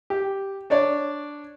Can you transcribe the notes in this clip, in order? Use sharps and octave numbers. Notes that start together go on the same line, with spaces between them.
G4
D4 C#5 D5